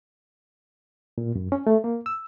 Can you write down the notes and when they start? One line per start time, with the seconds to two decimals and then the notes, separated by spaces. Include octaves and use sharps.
1.18 A#2
1.36 F#2
1.52 C#4
1.67 A3
1.84 A#3
2.06 E6